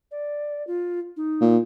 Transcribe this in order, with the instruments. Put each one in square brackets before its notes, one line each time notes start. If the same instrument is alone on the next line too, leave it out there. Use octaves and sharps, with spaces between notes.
[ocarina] D5
F4
D#4
[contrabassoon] A#2